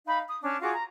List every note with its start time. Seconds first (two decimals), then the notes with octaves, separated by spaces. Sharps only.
0.06 D#4 F5 B5
0.27 D#6
0.42 C#4 D4
0.61 F4 F#4 G#4 D6
0.73 A#5